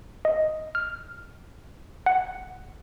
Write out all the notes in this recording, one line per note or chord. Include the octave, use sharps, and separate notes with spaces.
D#5
F6
F#5